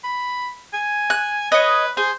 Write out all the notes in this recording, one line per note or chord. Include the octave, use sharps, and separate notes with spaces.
B5
G#5
F#6
B4 C#5 D#5
G#4 C5